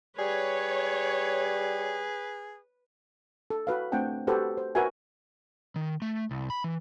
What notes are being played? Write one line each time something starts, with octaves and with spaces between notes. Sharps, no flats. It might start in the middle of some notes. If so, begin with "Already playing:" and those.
G3 G#4 B4 C#5
A4
F#4 B4 F5
A3 C4 D4 F#5 G5 A5
F#4 G4 A4 B4 C5
C5
F#4 A#4 B4 E5 G#5
D#3
A3
C2
B5
E3